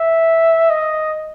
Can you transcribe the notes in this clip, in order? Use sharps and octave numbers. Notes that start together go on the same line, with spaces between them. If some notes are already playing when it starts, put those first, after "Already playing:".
Already playing: E5
D#5